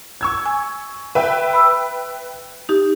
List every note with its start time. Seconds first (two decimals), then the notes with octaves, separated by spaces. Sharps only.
0.21 C#6 E6 G#6
0.46 G#5
1.15 B4 E5 G5
1.53 B5 E6
2.69 D#4 G4